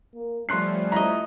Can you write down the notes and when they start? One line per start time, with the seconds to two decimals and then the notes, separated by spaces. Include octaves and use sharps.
0.15 A#3
0.49 F3 G3 A3 C#4 C6 F#6 C7
0.92 E4 D#5 A#5